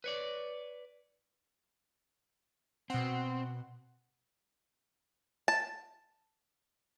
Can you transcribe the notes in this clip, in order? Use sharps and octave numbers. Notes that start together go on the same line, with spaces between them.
B4 C#5 D5
B2 C4 F#5
A5